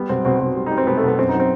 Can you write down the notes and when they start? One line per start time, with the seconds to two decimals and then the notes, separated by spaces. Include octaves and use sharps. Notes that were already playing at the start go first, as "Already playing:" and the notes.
Already playing: G3 B3
0.09 B1 C4
0.25 B1 C4
0.40 B1
0.56 G3
0.66 D#4
0.71 G3
0.78 C4
0.87 B2 B3
0.97 A3
1.03 B1
1.08 B3
1.19 F#2 C4
1.29 D#4
1.35 F#3
1.40 C4